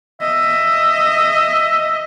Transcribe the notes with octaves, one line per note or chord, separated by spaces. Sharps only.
D#5 E5